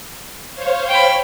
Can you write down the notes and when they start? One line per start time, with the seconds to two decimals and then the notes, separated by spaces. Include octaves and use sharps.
0.54 C5 C#5 F5
0.89 G5 B5